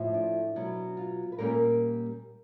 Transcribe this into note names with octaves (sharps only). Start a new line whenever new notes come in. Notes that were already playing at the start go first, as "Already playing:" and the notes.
Already playing: A2 F3 A3
D4
B2 F#3 B3
F4
B4
A#2 G3 A#3 C#4 A#4